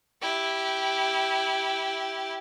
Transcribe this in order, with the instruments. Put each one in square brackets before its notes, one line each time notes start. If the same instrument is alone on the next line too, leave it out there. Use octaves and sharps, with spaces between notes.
[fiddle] E4 G4